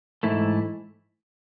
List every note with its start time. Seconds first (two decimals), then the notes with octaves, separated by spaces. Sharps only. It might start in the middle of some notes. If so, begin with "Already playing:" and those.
0.23 G#2 E3 A3 E4